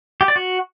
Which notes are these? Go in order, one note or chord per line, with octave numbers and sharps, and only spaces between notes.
G4
D5
F#4